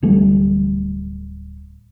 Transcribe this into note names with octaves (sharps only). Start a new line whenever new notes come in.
D1 E3 G3 A3